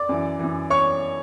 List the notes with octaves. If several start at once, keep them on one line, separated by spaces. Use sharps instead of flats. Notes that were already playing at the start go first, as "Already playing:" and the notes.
Already playing: D5 D6
F#2 E3
F#2 E3
C#5 C#6